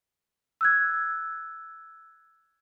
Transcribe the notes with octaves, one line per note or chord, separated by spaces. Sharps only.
E6 F#6 G#6